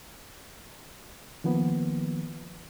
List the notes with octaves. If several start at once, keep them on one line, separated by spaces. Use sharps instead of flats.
D#3 F3 A#3 B3